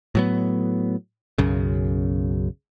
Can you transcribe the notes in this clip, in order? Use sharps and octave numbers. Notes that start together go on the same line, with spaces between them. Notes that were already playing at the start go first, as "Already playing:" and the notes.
A2 F#3 B3
B1 F#2 C#3